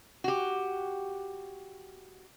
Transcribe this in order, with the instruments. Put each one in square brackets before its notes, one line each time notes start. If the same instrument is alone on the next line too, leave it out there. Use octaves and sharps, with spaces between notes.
[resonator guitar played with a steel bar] F#4 G4